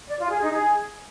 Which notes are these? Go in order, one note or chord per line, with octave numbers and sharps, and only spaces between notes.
D5
F4
G#4
D#4
G#4